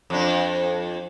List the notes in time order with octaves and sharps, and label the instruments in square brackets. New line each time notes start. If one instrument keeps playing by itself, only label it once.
[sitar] F2 D4